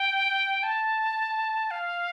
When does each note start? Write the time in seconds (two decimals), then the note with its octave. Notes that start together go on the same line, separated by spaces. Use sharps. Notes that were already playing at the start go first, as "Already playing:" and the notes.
Already playing: G5
0.63 A5
1.71 F5